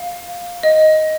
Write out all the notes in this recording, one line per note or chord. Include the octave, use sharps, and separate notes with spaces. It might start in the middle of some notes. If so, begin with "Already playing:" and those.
Already playing: F5
D#5